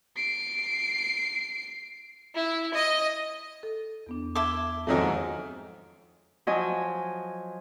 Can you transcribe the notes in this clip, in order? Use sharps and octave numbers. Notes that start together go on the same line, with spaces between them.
C7 D7
E4
D#5
A4
E2 B3 D4
E5 A5 C6 D6 G#6
F2 G#2 D#3 F#3 A3
F3 F#3 D#5 G#5